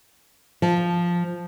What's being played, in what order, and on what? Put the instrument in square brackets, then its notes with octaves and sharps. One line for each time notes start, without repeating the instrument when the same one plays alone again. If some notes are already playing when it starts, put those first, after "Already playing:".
[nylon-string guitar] F3